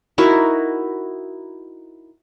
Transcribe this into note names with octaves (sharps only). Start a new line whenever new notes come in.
D#4 E4 F#4 A#4